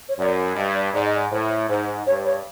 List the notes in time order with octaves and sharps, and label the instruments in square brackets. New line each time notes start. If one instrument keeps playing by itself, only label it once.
[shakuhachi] C#5
[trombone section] F#2 [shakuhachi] D5
[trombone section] G2 [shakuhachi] D#5
[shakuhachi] D5
[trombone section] G#2 [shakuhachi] D5
[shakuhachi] D#5
D5
[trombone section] A2 [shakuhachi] C5
[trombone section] G#2 [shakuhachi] C5
[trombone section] G2 [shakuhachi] C#5
[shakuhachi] C#5